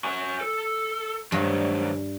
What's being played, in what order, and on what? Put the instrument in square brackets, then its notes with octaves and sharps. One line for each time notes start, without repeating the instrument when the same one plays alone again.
[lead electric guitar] F#4 G#5
A4
[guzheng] G2 [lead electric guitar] D#3 F#3